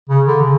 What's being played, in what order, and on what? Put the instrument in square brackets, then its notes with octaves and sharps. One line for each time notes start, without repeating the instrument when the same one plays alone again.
[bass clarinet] C#3
D3
C#3